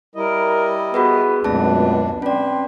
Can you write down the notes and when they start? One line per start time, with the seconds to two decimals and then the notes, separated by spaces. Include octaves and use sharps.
0.15 G3 E4 A#4 D#5
0.94 B3 F#4 G#4 B4
1.44 C#2 F#2 B2 A3 C4 D4 A5
2.22 C4 C#4 B4 D5